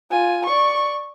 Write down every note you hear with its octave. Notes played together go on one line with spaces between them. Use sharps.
F4 G#5
D5 C#6